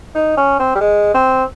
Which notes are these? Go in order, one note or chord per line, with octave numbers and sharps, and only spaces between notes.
D#4
C#4
C4
G3
G#3
C4